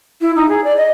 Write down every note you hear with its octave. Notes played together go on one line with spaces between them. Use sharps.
E4
D#4
G#4
D5
D#5